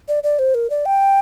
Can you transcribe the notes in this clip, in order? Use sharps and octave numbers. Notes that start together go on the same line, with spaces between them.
D5
D5
C5
A#4
D5
G5